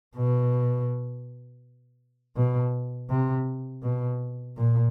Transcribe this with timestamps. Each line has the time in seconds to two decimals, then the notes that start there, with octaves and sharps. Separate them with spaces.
0.17 B2
2.36 B2
3.10 C3
3.83 B2
4.57 A#2